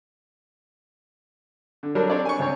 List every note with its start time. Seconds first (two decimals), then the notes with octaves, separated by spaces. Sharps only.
1.83 D3
1.95 F#3 G3 D4 A4 A#4
2.10 C4 D4 C#5 D5
2.25 G#5 C#6
2.39 C#2 C4 C#5